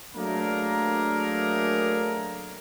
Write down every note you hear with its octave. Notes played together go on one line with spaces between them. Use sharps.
F#3 A3 A#3 D4 G#4 A#4